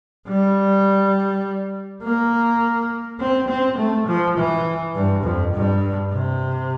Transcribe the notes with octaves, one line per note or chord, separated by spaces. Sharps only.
G3
A#3
C4
C4
A3
F3
E3
G2
F2
G2
C3